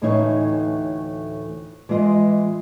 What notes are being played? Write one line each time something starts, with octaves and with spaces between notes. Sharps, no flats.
D2 A2 E3 C#4 D#4 C#5
E3 G#3 F4 D#5